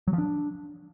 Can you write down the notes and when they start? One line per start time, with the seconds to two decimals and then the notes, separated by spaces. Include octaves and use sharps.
0.08 F#3
0.13 F3
0.18 D4